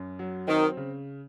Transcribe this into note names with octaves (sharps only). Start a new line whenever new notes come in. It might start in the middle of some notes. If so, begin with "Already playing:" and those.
Already playing: F#2
F#3
D#3 C4
C#3